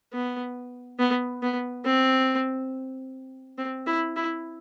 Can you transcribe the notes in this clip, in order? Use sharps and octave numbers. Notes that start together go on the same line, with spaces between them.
B3
B3
B3
C4
C4
E4
E4